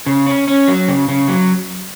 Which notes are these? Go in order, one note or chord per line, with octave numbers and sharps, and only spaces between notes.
C#3
C#4
C#4
F#3
C#3
C#3
F#3